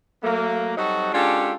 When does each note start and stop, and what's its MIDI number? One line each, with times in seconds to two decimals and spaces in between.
0.23 0.76 54
0.23 0.76 57
0.23 0.76 58
0.77 1.12 54
0.77 1.12 55
0.77 1.12 60
0.77 1.12 63
0.77 1.12 66
0.77 1.12 69
1.14 1.53 56
1.14 1.53 61
1.14 1.53 62
1.14 1.53 65
1.14 1.53 67
1.14 1.53 69